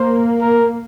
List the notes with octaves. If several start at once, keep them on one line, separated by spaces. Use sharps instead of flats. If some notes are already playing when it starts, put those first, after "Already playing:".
Already playing: A#3 C5
A#4